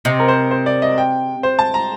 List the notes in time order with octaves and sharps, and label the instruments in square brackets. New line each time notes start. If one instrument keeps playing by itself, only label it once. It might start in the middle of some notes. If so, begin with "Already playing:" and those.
[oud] C3 [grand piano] D#5
[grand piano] A#4
C5
C5
D5
D#5
G5
C5
A5
A#5